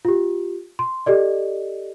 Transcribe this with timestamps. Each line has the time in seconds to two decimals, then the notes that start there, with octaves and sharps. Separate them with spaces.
0.05 F4 G4
0.79 C6
1.06 G4 A4 D5 D#5